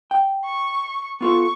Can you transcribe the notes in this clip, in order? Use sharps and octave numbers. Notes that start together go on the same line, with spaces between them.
G5
C#6
B3 F4 A4 C#6